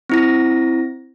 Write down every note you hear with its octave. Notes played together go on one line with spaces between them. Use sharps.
C4 E4 A#6